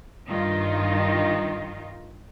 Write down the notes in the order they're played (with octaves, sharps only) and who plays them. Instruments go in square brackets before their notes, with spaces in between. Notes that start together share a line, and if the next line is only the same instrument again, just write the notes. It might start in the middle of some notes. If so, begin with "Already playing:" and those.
[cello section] G2 D#3 D#4 F4